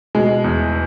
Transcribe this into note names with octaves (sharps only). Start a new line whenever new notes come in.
B2 G#3
E2